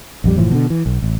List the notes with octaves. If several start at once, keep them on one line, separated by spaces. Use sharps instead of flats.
A#1 F2 G3
F#1 A2 E3 F3
B2 D3
E3
B1
A1